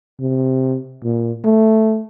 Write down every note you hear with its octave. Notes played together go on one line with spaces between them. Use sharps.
C3
A#2
A3